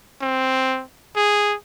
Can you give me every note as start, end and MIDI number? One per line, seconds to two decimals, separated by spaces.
0.21 0.83 60
1.16 1.55 68